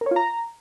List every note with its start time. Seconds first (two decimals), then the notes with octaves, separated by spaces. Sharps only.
0.01 A#4
0.06 C#5
0.11 F4
0.16 A#5